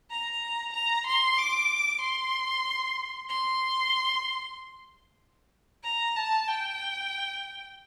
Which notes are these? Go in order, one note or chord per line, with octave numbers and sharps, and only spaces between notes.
A#5
A#5
C6
D6
C6
C6
A#5
A5
G5